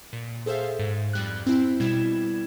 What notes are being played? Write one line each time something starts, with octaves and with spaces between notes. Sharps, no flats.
A#2
G#4 A4 C5 E5 F5
G#2
F2 G3 F#6
C4 E4
B2 G3 E4 G#6 E7